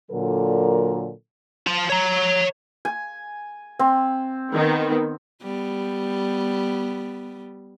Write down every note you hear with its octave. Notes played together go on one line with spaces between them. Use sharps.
A#2 D3 F#3 A4 A#4
F4 A5
C#5 A#5
G#5
C4
D#3 B3
G3 B3